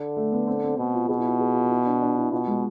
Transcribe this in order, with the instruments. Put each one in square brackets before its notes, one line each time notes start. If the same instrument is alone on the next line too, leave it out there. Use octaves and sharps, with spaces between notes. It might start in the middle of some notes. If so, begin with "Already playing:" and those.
Already playing: [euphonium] D3
[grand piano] A3
B3
C4
C4
[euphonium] B2
[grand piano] F4
[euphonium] B2 [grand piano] G#4
[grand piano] E4
F4
G#4
F4
E4
D4
D4
E4
[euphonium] B2 [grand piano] F4
[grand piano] G#3